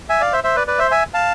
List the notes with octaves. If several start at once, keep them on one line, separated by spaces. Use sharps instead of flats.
E5 G#5
D5 F5
C5 E5
C5 E5
B4 D5
B4 D5
C5 E5
E5 G#5
F5 A5